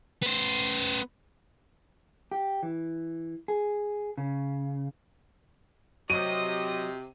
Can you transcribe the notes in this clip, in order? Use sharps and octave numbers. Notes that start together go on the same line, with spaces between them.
B3 C5
G4
E3
G#4
C#3
C3 F#3 D#5 D#6 D#7